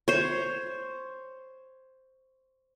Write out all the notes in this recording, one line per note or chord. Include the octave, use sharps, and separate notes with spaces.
C5 C#5